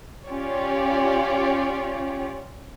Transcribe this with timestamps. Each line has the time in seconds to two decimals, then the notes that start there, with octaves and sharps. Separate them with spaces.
0.26 C#4 F4 G4 C#5 D5